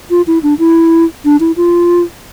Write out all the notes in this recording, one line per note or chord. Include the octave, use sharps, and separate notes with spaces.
F4
E4
D4
E4
D4
E4
F4